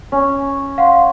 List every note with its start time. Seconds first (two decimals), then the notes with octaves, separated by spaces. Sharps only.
0.12 C#4
0.78 F5 F#5 C6